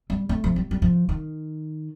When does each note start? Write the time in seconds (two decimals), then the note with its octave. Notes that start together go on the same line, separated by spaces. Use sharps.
0.10 G3
0.29 A3
0.44 F3
0.56 G3
0.71 G3
0.82 F3
1.09 D#3